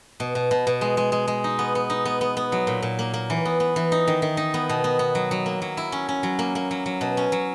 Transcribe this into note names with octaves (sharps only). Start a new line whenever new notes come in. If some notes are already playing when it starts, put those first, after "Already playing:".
B2
B2
B2
B2
G#3
G#3
G#3
G#3
D#4
B3
B3
D#4
B3
B3
B3
F#3
A#2
A#2
A#3
A#3
E3
B3
B3
E3
D#4
D#3
D#3
D#4
B3
B2
B3
B3
F#3
F#3
A#3
F#3
E4
C#4
C#4
F#3
A#3
A#3
F#3
F#3
B2
C#4
F#3